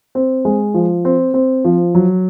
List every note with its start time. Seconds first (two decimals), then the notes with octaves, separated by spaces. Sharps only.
0.15 C4
0.45 G#3
0.74 F3
1.05 C4
1.34 C4
1.65 F3
1.95 F#3